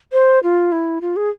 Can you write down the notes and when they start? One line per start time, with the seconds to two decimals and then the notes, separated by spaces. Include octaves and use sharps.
0.13 C5
0.43 F4
0.72 E4
1.01 F4
1.16 G#4